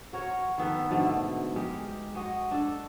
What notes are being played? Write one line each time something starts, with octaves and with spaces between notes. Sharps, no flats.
F#4 A#4 C#5
D#3 B3 A4 B4
G#2 B2 D3 A3
G#3 G4 A#4
G#3 F#4 D#5
D4 A4